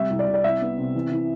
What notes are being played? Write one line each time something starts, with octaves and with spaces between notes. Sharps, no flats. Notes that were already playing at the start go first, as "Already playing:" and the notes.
Already playing: C3 G3 E5
C2
D5
C2
D5
C2 E5
B3
C3
E3
E3